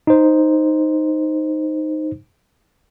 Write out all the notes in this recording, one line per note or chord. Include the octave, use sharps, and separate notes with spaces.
D#4 C5